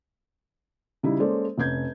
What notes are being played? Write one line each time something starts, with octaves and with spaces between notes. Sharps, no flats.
C#3 G3 D#4 E4
G#3 A#3 C#4 A4 C5 D5
F1 C#4 G6 G#6